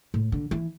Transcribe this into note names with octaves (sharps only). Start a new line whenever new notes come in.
A2
D3
E3